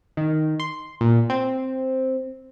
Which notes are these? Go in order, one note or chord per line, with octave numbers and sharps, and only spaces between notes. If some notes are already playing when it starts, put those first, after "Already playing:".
D#3
C6
A#2
C4